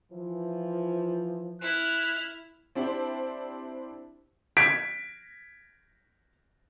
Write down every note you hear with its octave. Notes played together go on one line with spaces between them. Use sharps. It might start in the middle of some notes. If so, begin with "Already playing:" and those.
E3 F3
E4 F6 F#6
C4 D4 E4 G4 C5 A5
G#6 B6 D7